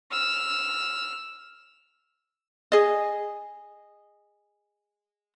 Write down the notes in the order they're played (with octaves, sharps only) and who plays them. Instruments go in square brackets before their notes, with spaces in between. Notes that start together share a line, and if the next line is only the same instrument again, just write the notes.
[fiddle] E6 F6
[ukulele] G#4 D#5